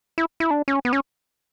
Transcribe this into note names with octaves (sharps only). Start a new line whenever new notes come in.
E4
E4
D4
C#4
B3
C#4